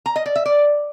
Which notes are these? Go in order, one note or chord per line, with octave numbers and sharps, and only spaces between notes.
A#5
D#5
D5
E5
D5